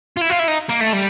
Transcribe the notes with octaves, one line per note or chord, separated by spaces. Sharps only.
F4
E4
F4
E4
D#4
A#3
A3
G3